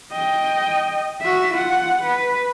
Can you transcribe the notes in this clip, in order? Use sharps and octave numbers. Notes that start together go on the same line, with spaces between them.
D#5 G5
F#4 E5
F4 F#5
B4